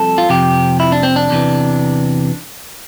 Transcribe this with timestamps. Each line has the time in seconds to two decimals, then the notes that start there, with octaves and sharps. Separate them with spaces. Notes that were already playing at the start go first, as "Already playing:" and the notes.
Already playing: C2 C3 F3 A4
0.18 F4
0.29 F2 C3 F3 G4
0.80 E4
0.92 D4
1.03 C4
1.16 D4
1.30 E2 C3 E3